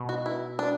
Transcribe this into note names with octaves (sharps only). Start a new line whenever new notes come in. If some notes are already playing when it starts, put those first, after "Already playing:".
Already playing: B2
F#4
E4
D4